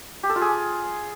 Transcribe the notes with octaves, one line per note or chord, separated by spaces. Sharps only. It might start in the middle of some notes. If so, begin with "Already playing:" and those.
G4
A4
F4
G#4